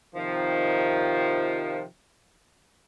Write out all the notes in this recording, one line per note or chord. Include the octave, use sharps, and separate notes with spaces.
C3 D#3 F3